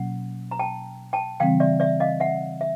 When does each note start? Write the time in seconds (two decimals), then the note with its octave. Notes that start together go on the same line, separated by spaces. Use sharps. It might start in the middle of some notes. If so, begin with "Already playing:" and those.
Already playing: B2 F#3 A#3 C#4 F#5
0.51 A#5
0.59 G5 A5
1.13 G5 A5
1.40 C#3 E3 G3 C4 F5 G5
1.60 D5 E5
1.80 D5 E5
2.00 D#5 F5
2.20 E5 F#5
2.61 E5